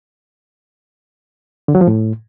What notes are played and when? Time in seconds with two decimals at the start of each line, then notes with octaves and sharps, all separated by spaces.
1.68 D3
1.75 F#3
1.81 F3
1.88 A2